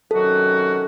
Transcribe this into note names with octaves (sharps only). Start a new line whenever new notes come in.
C3 D#3 F#3 C#4 F#4 A4